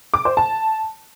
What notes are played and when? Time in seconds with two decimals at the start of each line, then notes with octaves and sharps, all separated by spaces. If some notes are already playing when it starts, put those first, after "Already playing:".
0.14 D6
0.25 C5
0.37 A5